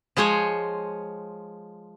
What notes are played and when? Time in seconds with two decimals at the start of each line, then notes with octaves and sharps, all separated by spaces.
0.16 F3 G#3 C5 C#5 G#5